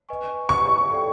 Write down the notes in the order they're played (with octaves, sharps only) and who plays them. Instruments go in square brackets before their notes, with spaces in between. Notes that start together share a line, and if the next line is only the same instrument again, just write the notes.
[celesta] B4 D#5 G#5 C#6
[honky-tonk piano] C#6
[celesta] A4 D5 G5